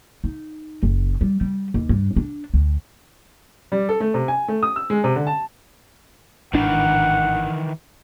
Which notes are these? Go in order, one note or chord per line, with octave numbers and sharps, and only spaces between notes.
D#4
F#1
G3
G3
D#2
G2
D4
D2
G3
A4
A3
C3
G#5
A3
D#6
E6
G#3
C3
D3
A5
G#1 A2 D#3 E3 D4 F#5